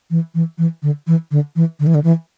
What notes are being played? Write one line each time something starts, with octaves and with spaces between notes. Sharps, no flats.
E3
E3
E3
D3
E3
D3
E3
D3
E3
D3
E3